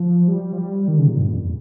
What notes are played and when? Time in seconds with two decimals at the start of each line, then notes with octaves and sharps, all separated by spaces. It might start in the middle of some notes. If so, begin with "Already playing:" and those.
Already playing: F3
0.28 G3
0.53 F3
0.58 G3
0.88 D#3
0.98 C#3
1.08 A#2
1.18 G2
1.29 A#2
1.34 F2